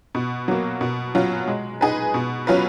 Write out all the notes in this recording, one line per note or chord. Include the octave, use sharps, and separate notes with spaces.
B2
F#3 A#3
B2
F#3 C#4 F4
G#3
D#4 G#4 B4
B2
F#3 C#4 F4 B4